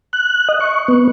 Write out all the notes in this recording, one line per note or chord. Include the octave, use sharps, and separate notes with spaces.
F#6
D#5
C#6
B3